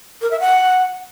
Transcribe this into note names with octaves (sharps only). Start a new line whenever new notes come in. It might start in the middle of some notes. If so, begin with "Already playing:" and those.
A#4
E5
F#5